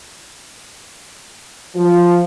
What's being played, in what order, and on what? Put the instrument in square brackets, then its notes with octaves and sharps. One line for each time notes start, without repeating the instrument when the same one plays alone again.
[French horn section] F3